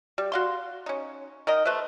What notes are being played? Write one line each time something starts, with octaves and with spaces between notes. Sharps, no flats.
G3
F#4 F5 C6
C#4 D#4
D#3 A#4 D#5
A3 B4 C5 E5